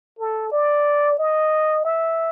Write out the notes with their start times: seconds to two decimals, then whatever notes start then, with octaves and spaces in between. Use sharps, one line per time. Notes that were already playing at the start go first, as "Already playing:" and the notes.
0.19 A4
0.52 D5
1.19 D#5
1.85 E5